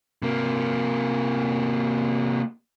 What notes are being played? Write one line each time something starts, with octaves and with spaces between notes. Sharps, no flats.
C3 A#3